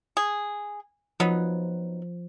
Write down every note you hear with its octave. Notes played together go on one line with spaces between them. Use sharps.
G#4
F3 F#3 B3 D#4